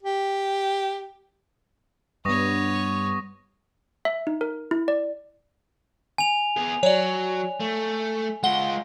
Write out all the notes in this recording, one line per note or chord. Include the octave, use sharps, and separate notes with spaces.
G4
G2 G3 B3 B4 C#5 C#6 D#6 A#6
E5
D#4
A#4
E4
D5
G#5 F7
B3 G#4
F#3 C#5 D5
A3
G#3 F4 F#5 G7